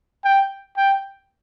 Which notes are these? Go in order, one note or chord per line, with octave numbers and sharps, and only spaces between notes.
G5
G5